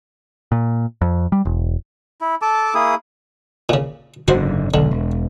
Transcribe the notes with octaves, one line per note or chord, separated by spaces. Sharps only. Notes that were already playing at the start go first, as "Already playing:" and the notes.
A#2
F2
G3
E1
E4
A4 A5 D6
A#3 E4 G#4 D#6
A#2 C#3
F#1 G#2 D3 F#4 C5
E1 B1 D3
E1